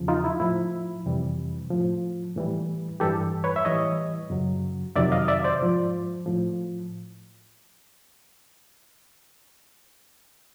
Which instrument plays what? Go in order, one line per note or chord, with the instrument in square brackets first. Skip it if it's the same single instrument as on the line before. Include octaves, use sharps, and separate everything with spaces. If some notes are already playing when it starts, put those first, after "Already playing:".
Already playing: [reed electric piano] E2 C#3 F3
D#4 F4
E4
A2 F3 E4
F2 C3 E3 G3
A2 F3
A2 E3 G3
G2 E3 G3 G4 A4
B4 C#5
E5
A2 E3 G3 C#5 D#5
F#2 C#3 F#3
F2 C3 D#3 F#3 D5 E5
D#5 F5
D5 E5
C5 D5
G#2 F3
A2 F3